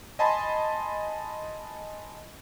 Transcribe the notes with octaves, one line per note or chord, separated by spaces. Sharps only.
D#5 G#5 A5 B5 C6